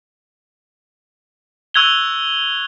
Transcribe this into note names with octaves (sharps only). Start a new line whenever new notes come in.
C#6 E6 F#6 G#6 F7 G7